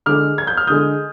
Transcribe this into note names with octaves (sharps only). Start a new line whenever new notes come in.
D3 G#3 D6 F6
G#6
G6
F6
D3 G#3 D#6 G6